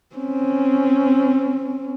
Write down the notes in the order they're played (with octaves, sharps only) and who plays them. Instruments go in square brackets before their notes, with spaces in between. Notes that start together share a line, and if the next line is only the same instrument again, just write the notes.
[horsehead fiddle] C4 C#4